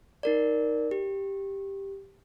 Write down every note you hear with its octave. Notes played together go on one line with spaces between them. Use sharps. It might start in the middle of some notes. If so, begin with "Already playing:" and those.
D#4 A#4 D5
G4